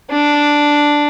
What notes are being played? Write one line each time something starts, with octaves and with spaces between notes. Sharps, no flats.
D4